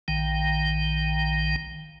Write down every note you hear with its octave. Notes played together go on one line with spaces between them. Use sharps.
A#1 D#3 G5